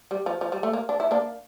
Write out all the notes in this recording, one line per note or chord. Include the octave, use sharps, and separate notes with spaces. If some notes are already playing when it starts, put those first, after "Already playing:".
G3
F3
F3
G3
A3
A#3
D4
E4
A#3 D4